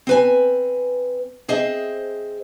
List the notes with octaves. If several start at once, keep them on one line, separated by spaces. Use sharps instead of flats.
C4 B4 G#5
C4 G#4 C5 D#5 E5